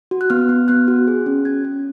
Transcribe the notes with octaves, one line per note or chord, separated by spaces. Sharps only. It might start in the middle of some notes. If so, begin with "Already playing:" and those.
F#4
F#6
B3 F6
B3
B3 F#6
F#4
G#4
C#4
C#4 G#6
C#4